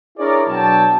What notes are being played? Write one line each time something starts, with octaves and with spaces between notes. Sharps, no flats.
D4 E4 G#4 A#4 C#5 D5
B2 F#3 D4 G5 A5